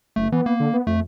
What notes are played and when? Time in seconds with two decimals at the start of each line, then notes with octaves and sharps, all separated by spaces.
0.16 F#1 A3
0.32 E3 B3
0.46 A#3
0.60 D3
0.74 B3
0.87 F2 A3